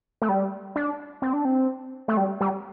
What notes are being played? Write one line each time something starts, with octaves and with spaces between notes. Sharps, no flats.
A3
G3
D4
C4
D4
C4
A3
G3
G3